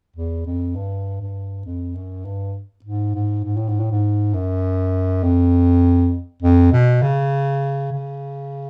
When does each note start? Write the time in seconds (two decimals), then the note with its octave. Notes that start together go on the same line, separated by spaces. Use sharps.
0.16 E2
0.46 F2
0.76 G2
1.22 G2
1.66 F2
1.95 F#2
2.25 G2
2.84 G#2
3.15 G#2
3.44 G#2
3.57 A2
3.69 G#2
3.80 A2
3.91 G#2
4.34 F#2
5.23 F2
6.42 F2
6.72 B2
7.02 C#3
7.92 C#3